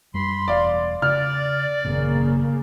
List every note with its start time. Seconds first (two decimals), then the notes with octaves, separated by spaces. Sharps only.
0.14 F#2 G3 B5 C6
0.48 E1 D5 F5
1.02 C#3 D5 F6
1.85 G#1 F#2 A#2 C#3 A#3